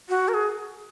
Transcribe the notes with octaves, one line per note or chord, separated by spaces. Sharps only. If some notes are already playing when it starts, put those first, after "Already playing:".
F#4
A#4
G#4